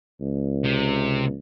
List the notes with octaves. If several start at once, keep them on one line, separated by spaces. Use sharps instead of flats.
C#2
C3